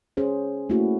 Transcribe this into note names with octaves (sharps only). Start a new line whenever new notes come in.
C#4 G#4 C5
A3 A#3 C#4 E4 F#4